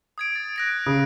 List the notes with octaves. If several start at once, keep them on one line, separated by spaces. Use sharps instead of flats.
D#6 G#6 D7
A6
F#6 A#6 D7
C#3 D#6